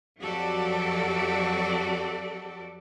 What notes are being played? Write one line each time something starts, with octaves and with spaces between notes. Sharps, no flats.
F2 F#3 F#4 G4 A4 D5